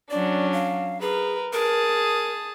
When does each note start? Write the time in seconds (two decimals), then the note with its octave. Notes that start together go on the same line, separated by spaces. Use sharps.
0.10 F#3 C#4 D4 D5
0.53 F5
1.01 G#4 A#4 B4
1.53 G#4 A#4 A5 D#6